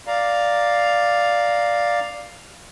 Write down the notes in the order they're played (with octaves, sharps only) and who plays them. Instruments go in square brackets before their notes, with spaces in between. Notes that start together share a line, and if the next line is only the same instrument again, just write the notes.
[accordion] D5 F5 A#5